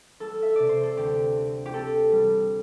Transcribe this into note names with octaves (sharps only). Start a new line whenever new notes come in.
G3 A4
E5
C3 D5
C5
A4
D2 G4
C4
G4
C4 A4
G3